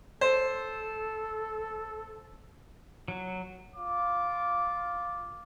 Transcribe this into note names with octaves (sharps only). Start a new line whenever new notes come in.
A4 C5
F#3
F4 D6